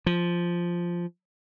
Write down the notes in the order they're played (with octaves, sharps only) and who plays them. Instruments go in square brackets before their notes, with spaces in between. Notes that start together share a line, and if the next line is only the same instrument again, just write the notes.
[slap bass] F3